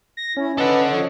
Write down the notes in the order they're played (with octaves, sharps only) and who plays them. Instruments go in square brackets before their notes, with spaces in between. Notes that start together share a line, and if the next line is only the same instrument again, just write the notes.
[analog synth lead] A#6
[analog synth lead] C#4 [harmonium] E4
[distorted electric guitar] A4 F#5 [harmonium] B4 D#5
[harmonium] F3 C#5 D#5